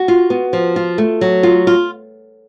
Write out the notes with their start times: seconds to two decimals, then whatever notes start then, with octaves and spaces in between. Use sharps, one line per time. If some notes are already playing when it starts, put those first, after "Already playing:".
Already playing: F#4
0.08 F4
0.30 B3
0.53 F3
0.76 F4
0.98 A3
1.21 F#3
1.43 F4
1.67 F4